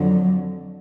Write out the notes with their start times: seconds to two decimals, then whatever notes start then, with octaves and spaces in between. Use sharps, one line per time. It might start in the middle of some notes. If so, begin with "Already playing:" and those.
Already playing: F2 D3 F#3